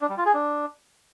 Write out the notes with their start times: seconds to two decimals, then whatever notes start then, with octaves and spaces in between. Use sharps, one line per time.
0.01 D4
0.10 G3
0.18 F4
0.26 G#4
0.34 D4